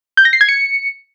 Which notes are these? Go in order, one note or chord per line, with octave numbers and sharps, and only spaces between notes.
G6
A#6
C7
G#6
C#7